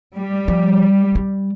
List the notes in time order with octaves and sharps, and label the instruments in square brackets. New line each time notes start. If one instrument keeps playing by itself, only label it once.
[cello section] G3
[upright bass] F3
G3